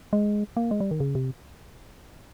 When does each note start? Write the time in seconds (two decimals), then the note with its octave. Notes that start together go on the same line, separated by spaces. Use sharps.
0.13 G#3
0.57 A#3
0.71 G#3
0.80 G3
0.91 D#3
1.00 C#3
1.15 C3